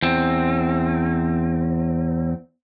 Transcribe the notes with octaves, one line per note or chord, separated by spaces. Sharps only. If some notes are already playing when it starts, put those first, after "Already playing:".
E2 C4